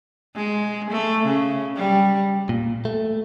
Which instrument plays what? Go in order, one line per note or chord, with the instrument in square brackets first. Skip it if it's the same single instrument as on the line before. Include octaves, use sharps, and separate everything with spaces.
[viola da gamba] G#3
A3
C#3
G3
[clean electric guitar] A#2
A3